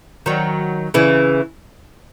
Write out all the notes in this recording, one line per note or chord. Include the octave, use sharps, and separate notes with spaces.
D#3 F#3
C#3 E3